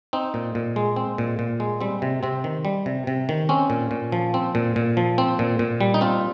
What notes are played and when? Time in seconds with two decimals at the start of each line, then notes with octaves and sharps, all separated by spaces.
0.13 C4 D#4
0.34 A#2
0.55 A#2
0.76 G#3
0.96 C4
1.18 A#2
1.39 A#2
1.60 G#3
1.81 G3 C4
2.02 C3
2.23 C3 C4
2.44 D#3
2.65 G3
2.86 C3
3.07 C3
3.29 D#3
3.49 C4 C#4
3.70 A#2
3.91 A#2
4.12 F3
4.34 C4
4.55 A#2
4.76 A#2
4.97 F3
5.18 C4
5.39 A#2
5.59 A#2
5.81 G3
5.94 D#4
6.01 C4 F4